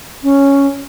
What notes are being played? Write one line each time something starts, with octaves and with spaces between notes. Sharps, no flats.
C#4